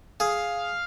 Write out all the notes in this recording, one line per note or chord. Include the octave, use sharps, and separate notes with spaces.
G#4 F5